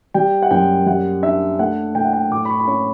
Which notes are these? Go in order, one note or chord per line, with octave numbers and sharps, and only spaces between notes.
G3 G5
F#5
F#2 G5
G3 F#5
D4 E5
A3 F#5
A3 G5
F#5
G5
A2 D6
B5
C#6
B5
C#4 C#6